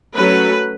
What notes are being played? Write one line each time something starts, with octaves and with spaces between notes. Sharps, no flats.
F#3 A3 C#4 B4